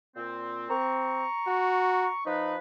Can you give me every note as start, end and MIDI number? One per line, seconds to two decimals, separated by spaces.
0.16 0.66 46
0.16 0.66 60
0.70 1.26 60
0.70 2.21 82
0.70 2.21 85
1.47 2.10 66
2.26 2.58 53
2.26 2.55 63
2.26 2.58 71